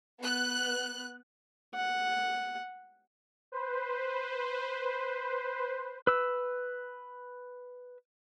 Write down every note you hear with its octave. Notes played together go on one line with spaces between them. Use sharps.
B3 F#6
F#5
B4 C5
B4 E6